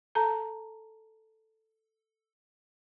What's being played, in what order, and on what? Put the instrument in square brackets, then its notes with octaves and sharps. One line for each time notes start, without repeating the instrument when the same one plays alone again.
[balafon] A4 A5 A#5